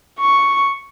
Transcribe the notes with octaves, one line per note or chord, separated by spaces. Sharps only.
C#6